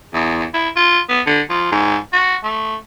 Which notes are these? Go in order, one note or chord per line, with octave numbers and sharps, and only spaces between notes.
E2
E4
F4
B3
D3
F3
G#2
F#4
A3